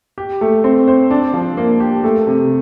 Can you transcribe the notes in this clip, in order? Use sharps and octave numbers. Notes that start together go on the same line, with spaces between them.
G4
A3
C4
C5
D4
F3
A#3
G4
A3
C3